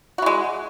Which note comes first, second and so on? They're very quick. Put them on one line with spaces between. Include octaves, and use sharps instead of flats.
F#4 E3 G#3